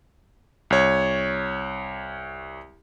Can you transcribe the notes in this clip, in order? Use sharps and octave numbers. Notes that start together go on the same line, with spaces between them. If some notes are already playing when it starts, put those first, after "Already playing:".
C2 C#5